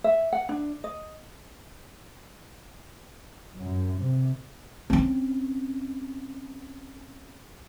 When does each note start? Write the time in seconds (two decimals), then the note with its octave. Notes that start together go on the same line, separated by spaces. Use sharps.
0.04 E5
0.33 F#5
0.49 D4
0.84 D#5
3.58 F#2
3.99 C3
4.90 C4 C#4